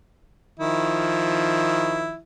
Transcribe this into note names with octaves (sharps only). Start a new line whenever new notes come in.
D#3 F3 E4